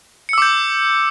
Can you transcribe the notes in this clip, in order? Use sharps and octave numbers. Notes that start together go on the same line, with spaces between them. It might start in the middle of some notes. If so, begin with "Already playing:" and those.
D6 E6 G6 C#7